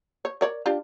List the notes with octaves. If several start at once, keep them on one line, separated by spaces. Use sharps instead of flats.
C#5
A#4 C#5 D5
D4 F4 G4